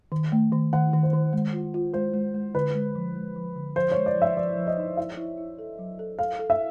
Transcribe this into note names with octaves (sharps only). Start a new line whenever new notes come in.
D#3
A3
D#3
D#3 F#5
D#3
C5
D#3
G#3
F4
F4
G#3 C5
G#3
G#3
D3 B4
G#3
F3
G#3
F3
D3
F3 C5
G#3 C#5
D5
F3
E5
F3 D5
F3
D#5
D#4
E4 E5
E4
E4
A4
F#3
A4
A4 F5
A4
E5